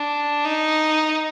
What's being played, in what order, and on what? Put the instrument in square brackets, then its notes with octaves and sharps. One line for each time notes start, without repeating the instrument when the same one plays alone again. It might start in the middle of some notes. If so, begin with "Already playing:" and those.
Already playing: [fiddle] D4
D#4